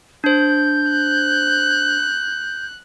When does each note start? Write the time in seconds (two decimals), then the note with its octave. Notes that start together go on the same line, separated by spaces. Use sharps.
0.24 D4 C5 G6
0.90 F#6